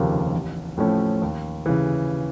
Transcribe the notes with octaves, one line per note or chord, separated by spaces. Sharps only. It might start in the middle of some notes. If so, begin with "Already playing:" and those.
Already playing: F1 D#2 C#3 F3 A#3
A1
A2 F3 A3 C#4
D#2
C#3 E3